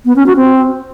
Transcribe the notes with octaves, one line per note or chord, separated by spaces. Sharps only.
B3
C#4
F#4
C4